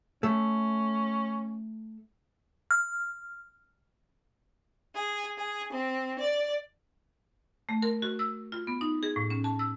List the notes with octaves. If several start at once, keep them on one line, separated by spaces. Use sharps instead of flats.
A3 C#4
F6
G#4
G#4
C4
D5
A3
A#4
F#4
E6
F4
B3
D#4
G#4
A2
C#4
A5
E6